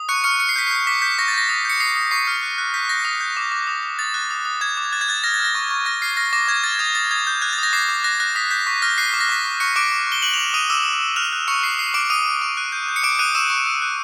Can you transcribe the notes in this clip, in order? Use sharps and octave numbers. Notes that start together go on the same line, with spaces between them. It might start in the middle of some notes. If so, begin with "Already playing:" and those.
Already playing: D#6
C#6 F#6 C#7
C#6 F6 C#7
F6 C#7
C7
G6 B6
G6 C7
D6 B6
G6 B6
C#6 A#6
A6
G6 A#6
D#6
G6 C#7
D#6 C7
D#6
C#6 C7
F6
F#6
F#6
G6 B6
G6 A#6
D#6
G6
D6
D6
D#6
D#6
D#6 A6
F#6
D#6
D#6
D6 G#6
D6
F#6 A6
G#6
F#6 A6
F6 A#6
A6
F6 A#6
C#6
C#6
F6 A#6
F6 C7
F6 A#6
D6 A#6
C#6 G#6
F6 A6
D#6 G#6
D#6 A6
D#6 G#6
G6
F#6 G#6
A6
D#6 A#6
D6 C7
D6
F#6 A#6
F#6 A#6
D#6 B6
G6 B6
C#6 B6
F6 A#6
F#6 C7
D6 B6
A#6
C#6 B6
C#6
C#6 F#6 C#7
D6 F#6 D7
C#6
C#6
G7
F#6 F#7
C#6 F7
E7
D6 D#6 D#7
D6 E6 E7
D6
D6
F6 F#6 F7
F#6
C#6 D#6 C#7
D#6 C7
E6 C7
C#6 D6 D7
D6 D#6 D#7
D6
C#6
F#6
G6
G6
C#7
D6 F#6 D7
D#6 F#6 D#7
C#6 E6 E7
C#6
D#6
F#6